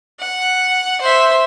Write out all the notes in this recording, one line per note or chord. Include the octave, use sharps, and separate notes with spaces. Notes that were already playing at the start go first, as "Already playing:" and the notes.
F#5
C5 E5